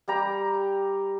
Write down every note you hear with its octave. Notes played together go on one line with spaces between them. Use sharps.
G3 G4 G5 A#5